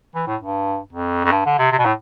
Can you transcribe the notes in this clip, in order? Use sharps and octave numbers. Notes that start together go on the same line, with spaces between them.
E3
A2
G2
F2
F2
G2
D3
C3
C3
B2
A2